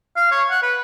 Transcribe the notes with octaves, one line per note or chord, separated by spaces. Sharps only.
F5
C#5
F#5
B4